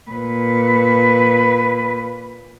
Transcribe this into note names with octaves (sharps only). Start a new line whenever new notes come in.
A#2 B4